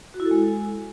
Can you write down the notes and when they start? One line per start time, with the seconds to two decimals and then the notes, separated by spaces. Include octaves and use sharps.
0.14 F#4
0.20 E4
0.25 A4
0.31 G#3